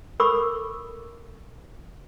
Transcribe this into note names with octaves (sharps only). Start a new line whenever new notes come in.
A4 A#4 B5 C#6 D6 E6